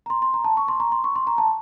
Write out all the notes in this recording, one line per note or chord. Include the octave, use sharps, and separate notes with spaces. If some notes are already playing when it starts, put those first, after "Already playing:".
A#5
C6
C6
A#5
A5
C#6
C6
A#5
C6
C#6
C6
A#5
A5